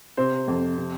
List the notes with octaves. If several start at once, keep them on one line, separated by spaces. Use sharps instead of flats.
C3 C5
F2
C3